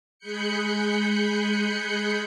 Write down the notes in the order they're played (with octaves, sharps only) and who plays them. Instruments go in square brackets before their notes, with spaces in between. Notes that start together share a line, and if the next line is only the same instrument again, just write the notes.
[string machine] G#3 G#4 B5 F#6 G6 C#7